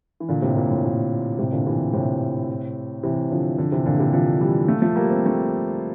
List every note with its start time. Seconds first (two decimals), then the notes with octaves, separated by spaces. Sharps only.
0.20 E3
0.29 A#2 D3
0.42 A2 C3
0.56 A#2
0.70 A2
0.84 A#2
1.38 A2 C3
1.52 A#2 D3
1.66 C3 E3
1.93 A2 C3
3.03 C3 E3
3.31 D3 F3
3.58 D3 F3
3.72 C3 E3
3.86 A#2 D3
3.99 C3 E3
4.13 D3 F3
4.40 E3 G3
4.68 F3 A3
4.82 F3 A3
4.96 G3 A#3
5.10 C4
5.26 A3 C4